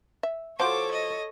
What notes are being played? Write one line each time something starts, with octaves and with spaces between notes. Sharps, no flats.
E5
F3 F4 F#4 A4 C5 C#5 D6
D#5